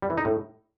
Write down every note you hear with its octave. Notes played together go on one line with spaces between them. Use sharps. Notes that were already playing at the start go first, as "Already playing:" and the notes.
G3
E3
D#4
A2